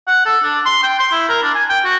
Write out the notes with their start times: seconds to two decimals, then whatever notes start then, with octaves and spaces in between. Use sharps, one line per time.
0.08 F#5
0.26 A4
0.43 D4
0.66 C6
0.83 G5
0.99 C6
1.12 E4
1.29 A#4
1.43 D4
1.55 G#5
1.70 G5
1.85 F#4